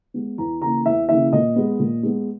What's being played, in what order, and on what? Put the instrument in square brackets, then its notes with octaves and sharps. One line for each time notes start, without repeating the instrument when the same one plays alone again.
[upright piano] G#3 B3
E2 A#5
C#3 E3 A#3 A#5
E2 E5
C#3 E3 A#3 E5
A#2 D#5
G#3 B3
A#2
G#3 B3